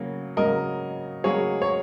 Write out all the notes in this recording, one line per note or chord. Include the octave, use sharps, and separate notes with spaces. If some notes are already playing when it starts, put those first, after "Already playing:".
Already playing: C#3 F#3 A#3
C#3 F#3 A#3 A#4 D#5
C#3 F#3 A#3 G#4 C#5
C#5